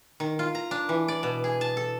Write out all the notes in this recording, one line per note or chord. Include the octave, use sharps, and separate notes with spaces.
D#3
F4
A#5
D4
E3
D5
B2
G#4
A5
A4